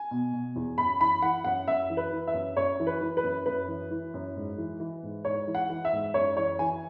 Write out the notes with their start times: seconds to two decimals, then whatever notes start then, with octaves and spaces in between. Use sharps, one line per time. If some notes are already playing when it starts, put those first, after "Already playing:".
Already playing: G#5
0.11 B2
0.33 B2
0.56 E2
0.78 F#2 B5
1.00 E3 B5
1.22 E3 F#5
1.44 F#2 F#5
1.68 F#2 E5
1.90 E3
1.97 B4
2.12 E3
2.27 E5
2.34 F#2
2.57 F#2 C#5
2.80 E3
2.87 B4
3.01 E3
3.17 B4
3.23 F#2
3.46 F#2 B4
3.68 E3
3.91 E3
4.14 F#2
4.36 G#2
4.58 E3
4.80 E3
5.03 G#2
5.25 G#2 C#5
5.47 E3
5.55 F#5
5.70 E3
5.85 E5
5.92 G#2
6.14 F#2 C#5
6.37 E3 C#5
6.59 E3 G#5